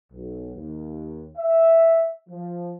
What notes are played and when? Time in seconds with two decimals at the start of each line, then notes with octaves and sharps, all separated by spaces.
0.13 B1
0.55 D#2
1.37 E5
2.29 F3